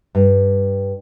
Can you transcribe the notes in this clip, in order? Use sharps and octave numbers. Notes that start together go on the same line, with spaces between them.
G2